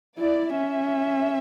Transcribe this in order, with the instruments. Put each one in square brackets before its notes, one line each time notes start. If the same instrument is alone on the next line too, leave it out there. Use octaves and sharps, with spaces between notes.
[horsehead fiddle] E4 [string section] D5
[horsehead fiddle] C#4 [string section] E5